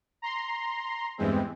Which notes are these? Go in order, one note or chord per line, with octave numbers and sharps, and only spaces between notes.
A#5 C6
E2 G2 E3 G#3 C4